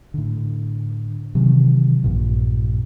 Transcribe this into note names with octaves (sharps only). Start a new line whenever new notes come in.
A2 D3
C3 D#3 E3 F#3
A#1 G2 A#2